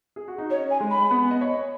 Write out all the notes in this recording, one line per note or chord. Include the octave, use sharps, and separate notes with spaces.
G#4
F#4
D#4
C#4 C#5
G#5
G#3
B5
B3
D#5
C#5